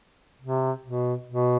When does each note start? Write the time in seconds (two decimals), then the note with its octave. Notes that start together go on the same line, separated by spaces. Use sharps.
0.42 C3
0.84 B2
1.28 B2